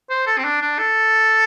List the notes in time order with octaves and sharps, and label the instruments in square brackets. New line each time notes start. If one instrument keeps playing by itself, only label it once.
[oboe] C5
A4
C4
D4
D4
A4